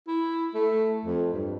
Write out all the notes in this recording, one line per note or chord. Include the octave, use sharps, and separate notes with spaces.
E4
A3
F2
G2